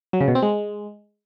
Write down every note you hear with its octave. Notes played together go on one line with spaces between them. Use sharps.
F#3
C#3
B2
C4
G#3